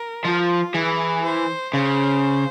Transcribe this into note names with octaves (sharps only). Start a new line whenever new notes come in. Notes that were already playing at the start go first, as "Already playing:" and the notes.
Already playing: A#4
F3 F4
E3 G#4
C5
C#3 C5